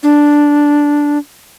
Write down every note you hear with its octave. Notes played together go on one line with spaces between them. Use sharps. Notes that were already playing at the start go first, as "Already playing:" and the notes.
D4